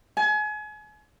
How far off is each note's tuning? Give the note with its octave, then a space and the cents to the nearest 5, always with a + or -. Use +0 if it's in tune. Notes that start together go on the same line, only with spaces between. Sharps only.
G#5 +35